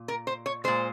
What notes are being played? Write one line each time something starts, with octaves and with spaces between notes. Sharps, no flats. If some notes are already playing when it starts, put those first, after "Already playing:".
Already playing: A#2
A#4
C5
C#5
A#2 G#3 C5